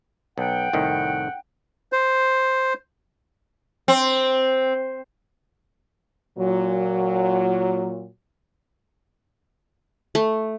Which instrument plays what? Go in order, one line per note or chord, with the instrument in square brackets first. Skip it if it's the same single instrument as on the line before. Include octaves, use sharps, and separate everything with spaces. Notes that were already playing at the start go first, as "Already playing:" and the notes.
[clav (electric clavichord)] B1 [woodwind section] F#5 G5
[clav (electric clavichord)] C2 A2 D#3
[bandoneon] C5
[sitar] C4
[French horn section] A#2 F#3
[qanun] A3